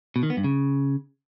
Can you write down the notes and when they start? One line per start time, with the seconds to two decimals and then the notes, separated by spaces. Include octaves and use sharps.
0.16 B2
0.23 D#3
0.30 B3
0.37 G2
0.44 C#3